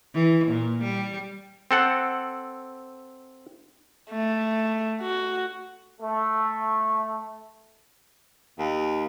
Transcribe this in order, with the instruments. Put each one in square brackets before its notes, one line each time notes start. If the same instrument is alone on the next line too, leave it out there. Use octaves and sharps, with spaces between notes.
[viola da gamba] E3
A#2
G3
[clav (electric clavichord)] C4 A4 F#5
[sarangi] A3
F#4
[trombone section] A3
[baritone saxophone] D#2